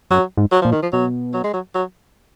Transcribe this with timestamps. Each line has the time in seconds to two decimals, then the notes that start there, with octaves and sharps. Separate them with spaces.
0.10 F#2 F#3
0.37 G#2
0.52 F#3
0.62 A#2 F3
0.72 D#3
0.82 F3
0.93 B2 F#3
1.34 F#3
1.44 G#3
1.53 F#3
1.75 F#3